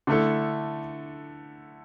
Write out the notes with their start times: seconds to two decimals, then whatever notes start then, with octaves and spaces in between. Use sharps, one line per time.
0.07 D3 A3 E4 A4